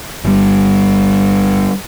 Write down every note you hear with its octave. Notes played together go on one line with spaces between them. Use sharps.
G1 G3